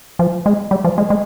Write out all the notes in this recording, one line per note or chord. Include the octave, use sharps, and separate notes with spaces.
F3
G#3
G3
F3
G#3
G#3